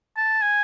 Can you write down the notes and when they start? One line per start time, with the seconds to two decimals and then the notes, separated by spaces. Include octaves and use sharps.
0.17 A5
0.42 G#5